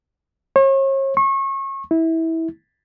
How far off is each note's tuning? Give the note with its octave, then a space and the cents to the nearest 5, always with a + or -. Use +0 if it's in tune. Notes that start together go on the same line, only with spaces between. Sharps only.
C#5 -40
C#6 -30
E4 -20